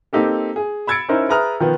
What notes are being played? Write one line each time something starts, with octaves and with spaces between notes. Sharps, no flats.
A#3 C4 D#4 G4 A4
G#4
B5 E6 G#6 A6 C#7 D7
C#4 D#4 E4 A#4 C5
G#4 B4 E5 A#5 D#6 F6
D#3 F3 B3